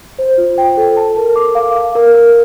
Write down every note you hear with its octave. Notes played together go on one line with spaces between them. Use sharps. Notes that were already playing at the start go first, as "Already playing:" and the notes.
C5
F4
G5
A4
A5
A#4
D6
F5
F5
A#4
A#4